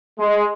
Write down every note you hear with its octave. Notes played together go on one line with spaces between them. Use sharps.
G#3